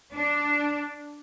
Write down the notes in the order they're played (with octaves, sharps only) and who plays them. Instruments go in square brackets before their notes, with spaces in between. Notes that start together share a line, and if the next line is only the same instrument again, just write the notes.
[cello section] D4